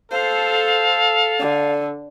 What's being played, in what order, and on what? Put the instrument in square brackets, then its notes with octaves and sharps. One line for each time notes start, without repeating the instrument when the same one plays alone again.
[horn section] A4 [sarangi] C5 [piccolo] F5
[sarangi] D3